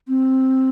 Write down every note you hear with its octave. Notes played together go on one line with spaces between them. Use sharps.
C4